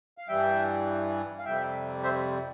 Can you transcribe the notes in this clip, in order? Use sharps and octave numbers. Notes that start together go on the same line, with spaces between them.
F5
G2 E3 G3 E5 G5
F5
F2 C3 G3 E5 G5
C5 E5